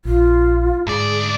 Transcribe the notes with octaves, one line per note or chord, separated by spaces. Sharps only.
A#1 F4
D2 G#2 G#4 D5